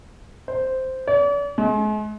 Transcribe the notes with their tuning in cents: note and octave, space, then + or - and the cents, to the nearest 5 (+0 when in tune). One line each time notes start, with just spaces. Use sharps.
C5 -5
D5 -45
G#3 +40